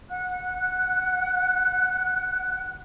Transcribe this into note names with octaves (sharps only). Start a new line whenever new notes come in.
F#5 F#6